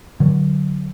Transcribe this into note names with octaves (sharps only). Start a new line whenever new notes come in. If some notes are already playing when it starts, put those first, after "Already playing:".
D3 F#3